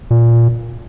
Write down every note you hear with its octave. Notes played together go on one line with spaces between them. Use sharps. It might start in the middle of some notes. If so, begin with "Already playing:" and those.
A#2